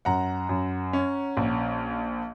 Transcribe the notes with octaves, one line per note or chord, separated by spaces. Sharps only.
F#2 F#5 A#5
F#2
C#4
A#1